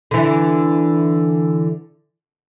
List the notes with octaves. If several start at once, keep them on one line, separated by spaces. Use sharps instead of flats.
D3 E3